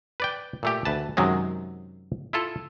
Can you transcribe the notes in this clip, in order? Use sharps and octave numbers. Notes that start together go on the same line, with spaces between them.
B4 D5 G5
A#2 A3 G4
D2 B4 A5
F#2 C3 D#3 F#3 G#3
E4 F4 A4